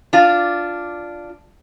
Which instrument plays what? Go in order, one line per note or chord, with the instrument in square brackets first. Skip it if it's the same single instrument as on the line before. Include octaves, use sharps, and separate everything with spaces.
[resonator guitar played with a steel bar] D4 F4